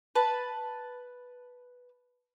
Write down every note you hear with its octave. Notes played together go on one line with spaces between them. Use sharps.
B4 A5